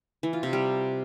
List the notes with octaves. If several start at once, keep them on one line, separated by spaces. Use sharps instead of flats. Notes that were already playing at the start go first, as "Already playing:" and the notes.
E3
F4
C3
G3